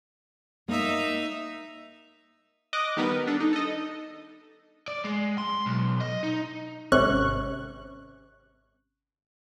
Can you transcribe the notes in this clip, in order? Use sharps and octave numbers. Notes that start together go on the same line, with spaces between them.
A#3 D#4 E5
D#5 D6 F#6
D#3 G3 B3 A#4 B4
D4 A4
D#4
A4 D#5
D5
G#3
C6
B1
D#5
D#4
G#1 C3 C#4 C#6 F#6